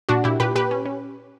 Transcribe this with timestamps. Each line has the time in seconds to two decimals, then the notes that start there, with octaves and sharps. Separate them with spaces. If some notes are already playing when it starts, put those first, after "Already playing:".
0.09 A#2 D4 F#4
0.24 A#2 E4 G4
0.40 A#2 G4 B4
0.55 A#2 G4 B4
0.71 C#4
0.85 C#4